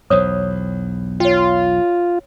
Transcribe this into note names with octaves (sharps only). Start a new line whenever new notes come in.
B1 E2 C5 C#5 D#6
F4 C#5 G5